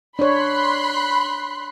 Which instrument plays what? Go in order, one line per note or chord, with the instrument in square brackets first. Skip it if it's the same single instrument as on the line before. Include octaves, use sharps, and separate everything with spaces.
[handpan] D4 C#5 [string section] B5 C6 F#6